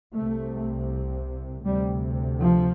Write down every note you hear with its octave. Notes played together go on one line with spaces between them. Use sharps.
C2 C3 A3
D2 C3 G3
F3